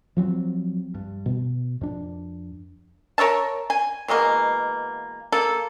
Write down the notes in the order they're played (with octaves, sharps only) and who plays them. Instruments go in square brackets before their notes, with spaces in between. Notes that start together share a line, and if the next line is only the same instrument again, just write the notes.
[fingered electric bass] F3 F#3 B3 C4
G2
B2
F2 D4
[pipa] A#4 C#5 E5 A5
G#5
B2 E3 G#3 A#3
A#3 A4